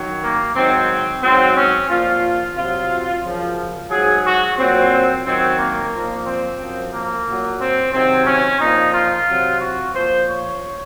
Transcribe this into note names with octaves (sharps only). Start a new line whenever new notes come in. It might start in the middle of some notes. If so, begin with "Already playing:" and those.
Already playing: F#2 D#3 F#3
A#3
G#2 D#3 F#3 C4
G#2 F#3 C4
C#4
A#2 F3 F4
C3 F#3 F4
F#2 C#3 F3
G#2 F#3 G#4
F#4
A#2 F#3 C4
F#2 D#3 F#3 C4
A#3
A#2 F3
C4
F#2 F3
A#3
A#2 F#3
C4
C3 D#3 F#3 C4
C#4
A#2 F3 D#4
F4
C3 F#3
F#4
A#2 F3 C5
C#5